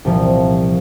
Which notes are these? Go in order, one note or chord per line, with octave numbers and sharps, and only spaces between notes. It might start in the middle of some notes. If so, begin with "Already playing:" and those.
C2 A#2 F3